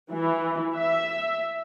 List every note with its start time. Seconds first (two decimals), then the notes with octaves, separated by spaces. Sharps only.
0.11 E3
0.75 E5